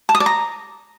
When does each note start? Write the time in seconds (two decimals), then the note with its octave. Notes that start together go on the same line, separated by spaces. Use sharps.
0.09 A5
0.15 D#6
0.20 D5
0.26 A#5